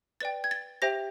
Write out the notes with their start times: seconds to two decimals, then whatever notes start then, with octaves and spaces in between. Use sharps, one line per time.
0.20 B4 D5 G5 A6
0.44 G#6
0.51 A6
0.82 G4 C5 E5 G5 A#6